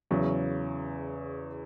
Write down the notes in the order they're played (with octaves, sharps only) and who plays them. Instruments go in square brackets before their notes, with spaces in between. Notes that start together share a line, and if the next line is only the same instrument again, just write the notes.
[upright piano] E2 C#3 F#3